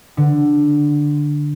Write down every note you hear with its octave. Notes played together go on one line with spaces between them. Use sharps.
D3